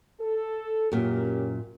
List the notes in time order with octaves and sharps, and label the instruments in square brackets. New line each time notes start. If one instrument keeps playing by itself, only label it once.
[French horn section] A4
[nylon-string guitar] F#2 A#2 [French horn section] C#4 G4 A#4